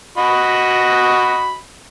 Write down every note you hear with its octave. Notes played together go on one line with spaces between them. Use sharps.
F#4 D#5 B5